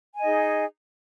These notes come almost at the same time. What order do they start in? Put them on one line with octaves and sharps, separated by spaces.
G#5 D#5 D#4 G#4